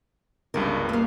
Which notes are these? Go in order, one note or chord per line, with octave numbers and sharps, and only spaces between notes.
G1 C#2 G2 A#4
A3 A#3